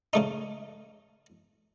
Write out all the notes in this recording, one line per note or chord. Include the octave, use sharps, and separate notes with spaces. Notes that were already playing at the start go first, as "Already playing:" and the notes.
C#3 A3 D#4